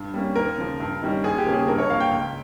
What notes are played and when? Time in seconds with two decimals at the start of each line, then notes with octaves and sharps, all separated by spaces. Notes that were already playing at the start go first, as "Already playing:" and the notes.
Already playing: G2
0.14 G3 A#3 C#4
0.36 D#2 A#4
0.58 C#3 F3
0.80 G2
1.02 D#3 G3 C#4
1.24 D#2 G#4
1.38 G4
1.46 C#3 F3 A#3 C#4
1.54 G#4
1.67 G2 A#4
1.78 C#5
1.89 F3 A#3 F5
2.00 G5
2.11 C#2